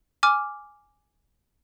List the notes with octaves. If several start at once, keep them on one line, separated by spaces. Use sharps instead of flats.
G#5 D6 F6